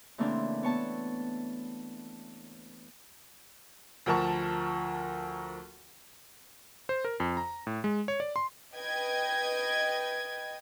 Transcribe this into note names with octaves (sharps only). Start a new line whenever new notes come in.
C#3 E3 A3 A#3 C4 D4
B3 C#5 A5
D2 F3 A#4 A5 C#6
C5
A#4
F2
A#5
A2
G#3
C#5
D5
C6
B4 D#5 G5 G#6